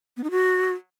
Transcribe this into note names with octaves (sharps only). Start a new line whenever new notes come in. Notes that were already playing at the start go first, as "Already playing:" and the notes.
B3
D#4
F#4